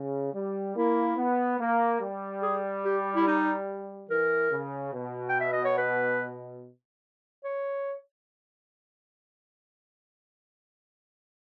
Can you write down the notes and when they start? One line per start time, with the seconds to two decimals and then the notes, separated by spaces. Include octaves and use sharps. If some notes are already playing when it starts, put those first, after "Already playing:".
Already playing: C#3
0.34 G3
0.76 A#3 E4
1.17 B3
1.60 A#3
2.01 G3
2.43 G#4
2.85 G4
3.15 E4
3.27 D#4
4.10 E3 A#4
4.52 C#3
4.94 B2
5.29 G5
5.40 E5
5.53 D#5
5.64 C#5
5.78 B4
7.44 C#5